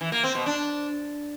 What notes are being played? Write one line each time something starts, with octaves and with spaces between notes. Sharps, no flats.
E3
A#3
C4
B2
D4